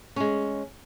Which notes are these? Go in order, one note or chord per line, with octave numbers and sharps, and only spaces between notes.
G#3 C#4